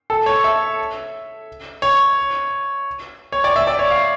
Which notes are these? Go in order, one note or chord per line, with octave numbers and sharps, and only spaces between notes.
A4
C#5
E5
C#5
C#5
D5
E5
D5
C#5
F5